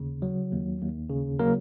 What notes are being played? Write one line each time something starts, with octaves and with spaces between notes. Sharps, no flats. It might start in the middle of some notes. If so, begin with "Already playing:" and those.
Already playing: D#2 C#3
F#3
D#2
D#2
C#3
F#3 A#3 A#4